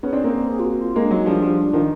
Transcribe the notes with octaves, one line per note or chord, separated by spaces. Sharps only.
B3 C#4 G#4
C4 D4
A#3 C4
F4
F#4
F4
G#3 A#3
D4
F#3 G#3 D#4
F3 G3 D4
F3 G3
D#3 F3